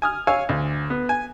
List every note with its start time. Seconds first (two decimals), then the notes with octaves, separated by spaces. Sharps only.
0.02 G#5 D#6 F6
0.27 C#5 F5 G#5 E6
0.49 D2
0.90 B3
1.09 G#5